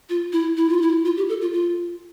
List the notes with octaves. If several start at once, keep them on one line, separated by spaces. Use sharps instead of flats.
F4
E4
E4
F4
E4
F4
G4
A4
F4
F4